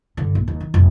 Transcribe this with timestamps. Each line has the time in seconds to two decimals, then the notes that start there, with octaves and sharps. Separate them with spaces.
0.17 G2 D3
0.35 A#1
0.48 D#2
0.60 D#3
0.74 F1 A#1